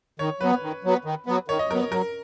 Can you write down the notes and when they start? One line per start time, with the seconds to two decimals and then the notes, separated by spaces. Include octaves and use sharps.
0.19 D#3 C#5
0.41 F#3 B3 B4
0.62 D#3
0.84 F#3 B3
1.05 D#3
1.26 F#3 B3
1.48 D#3 C#5
1.59 D#5
1.70 F#3 A#4
1.74 B3
1.92 F#3 A#4